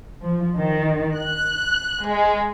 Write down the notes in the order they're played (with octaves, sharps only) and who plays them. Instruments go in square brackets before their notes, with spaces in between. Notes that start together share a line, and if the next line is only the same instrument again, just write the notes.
[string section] F3
D#3
F#6
G#3